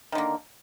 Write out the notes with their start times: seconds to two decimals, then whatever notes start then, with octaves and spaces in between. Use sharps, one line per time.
0.12 D#3
0.15 D3
0.18 A#3